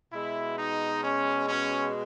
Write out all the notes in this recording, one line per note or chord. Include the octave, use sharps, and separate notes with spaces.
B2 G#3 E4
D#4
C#4
C#4